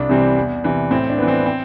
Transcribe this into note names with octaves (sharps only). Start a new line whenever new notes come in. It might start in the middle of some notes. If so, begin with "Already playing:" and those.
Already playing: C2 D4
C3 E3 G3 C4
E2
C3 E3
A2 C4
D4
E3 B3
C4
C4